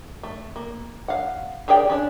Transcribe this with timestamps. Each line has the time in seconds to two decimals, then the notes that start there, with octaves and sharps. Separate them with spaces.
0.23 A3
0.56 A#3
1.08 F5 F#5
1.68 G4 G#4 A#4 D5 G5
1.90 C#4 D4